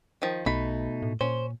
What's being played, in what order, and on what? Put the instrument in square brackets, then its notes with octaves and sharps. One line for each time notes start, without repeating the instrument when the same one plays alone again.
[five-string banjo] D#3 F3
[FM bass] B1 [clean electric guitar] B2 A3 D#4 [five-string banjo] B5
[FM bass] A2
[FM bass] A#2 [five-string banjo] C#4 [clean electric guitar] C5